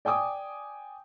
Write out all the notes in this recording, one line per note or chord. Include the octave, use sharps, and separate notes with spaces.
D5 G5 G#5 D6 D#6